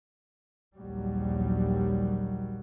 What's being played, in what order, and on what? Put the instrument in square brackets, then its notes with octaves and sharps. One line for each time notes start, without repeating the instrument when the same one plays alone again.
[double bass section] A#1 D#2 F#3 G3